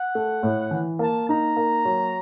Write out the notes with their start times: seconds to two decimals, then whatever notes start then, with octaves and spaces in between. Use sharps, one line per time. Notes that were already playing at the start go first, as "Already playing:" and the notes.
Already playing: F#5
0.15 A3
0.43 A2
0.71 E3
0.99 A#3 A5
1.28 D#4 A#5
1.57 A#3
1.85 F#3